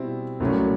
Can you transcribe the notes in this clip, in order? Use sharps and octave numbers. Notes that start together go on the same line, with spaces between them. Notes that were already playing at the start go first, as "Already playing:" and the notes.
Already playing: B2 G3 C4 E4
C2 A#2 F#3 A3 C#4